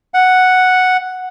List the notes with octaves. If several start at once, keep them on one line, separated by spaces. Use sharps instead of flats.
F#5